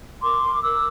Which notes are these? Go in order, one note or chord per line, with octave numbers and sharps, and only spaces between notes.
A#4 C6 D6
A#4
A#4 D6 E6